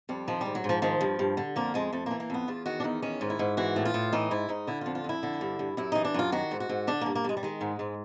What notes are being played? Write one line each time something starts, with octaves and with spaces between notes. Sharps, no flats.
F2 G3
D#3 F3
G#2 G3
F#3
G#2
F3
D#3 F3
G2
G2
D3
F2 A#3
F2 G#3
F2 A3
E3 A#3
A#3
F2 B3
E2 F4
D#3 F#4
D4
E2 D#4
D#3 C#4
G#2
E4
G#2
E3 F#4
A2
F4
A2
E3 D#4
G#2 E4
G#2 D#4
D3 E4
F2 F4
F4
F2 E4
D3
G2
G2
F#2 E4
E3 D#4
D4
F#2 F4
D#3 F#4
G#2
F#4
G#2
D3 D4
G2 A#3
A#3
G2 G#3
G3
D#3 G#3
G#2
G#2